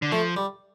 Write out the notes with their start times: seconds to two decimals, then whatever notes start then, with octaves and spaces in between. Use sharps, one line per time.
0.02 D3
0.11 F3 A3
0.37 G3